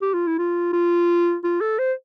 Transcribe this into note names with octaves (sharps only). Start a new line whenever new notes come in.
G4
F4
E4
F4
F4
F4
A4
C5